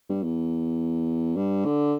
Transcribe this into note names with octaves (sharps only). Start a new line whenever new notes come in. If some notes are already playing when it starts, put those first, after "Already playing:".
G2
E2
G2
D3